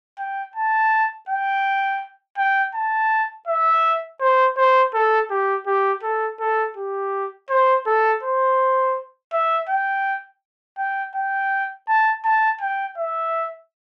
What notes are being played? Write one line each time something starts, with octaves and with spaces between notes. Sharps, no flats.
G5
A5
G5
G5
A5
E5
C5
C5
A4
G4
G4
A4
A4
G4
C5
A4
C5
E5
G5
G5
G5
A5
A5
G5
E5